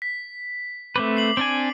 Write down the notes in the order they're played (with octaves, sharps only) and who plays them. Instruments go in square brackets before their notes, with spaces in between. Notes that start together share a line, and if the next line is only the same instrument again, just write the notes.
[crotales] B6
[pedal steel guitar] A3 C4 B4 [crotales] D6
[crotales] C7 F#7
[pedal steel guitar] C4 D4 G#5 [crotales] D7